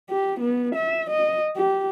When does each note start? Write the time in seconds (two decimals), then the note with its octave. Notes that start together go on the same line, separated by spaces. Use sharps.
0.10 G4
0.40 B3
0.75 E5
1.10 D#5
1.56 G4